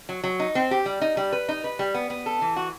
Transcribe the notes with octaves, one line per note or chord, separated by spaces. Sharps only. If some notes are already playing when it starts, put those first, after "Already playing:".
F#3
F#3
D#4
C4
G4
G3
D#4
G3
B4
D#4
B4
G3
B3
B3
A4
E3
F#4